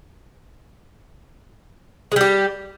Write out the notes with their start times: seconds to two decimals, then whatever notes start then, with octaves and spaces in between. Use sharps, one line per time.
2.12 G#3
2.16 G3
2.21 G4